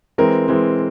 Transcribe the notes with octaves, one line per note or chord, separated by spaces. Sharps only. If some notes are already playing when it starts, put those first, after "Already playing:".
E3 G#3 C4 A#4
E3 G#3 C4